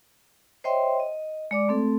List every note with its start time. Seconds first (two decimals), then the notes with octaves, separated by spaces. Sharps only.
0.64 C5 C#5 D#5 E5 G5 C6
1.00 D#5
1.51 G#3 D5 D6
1.68 A3 C4 A4